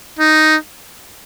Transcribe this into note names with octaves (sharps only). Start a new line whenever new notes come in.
D#4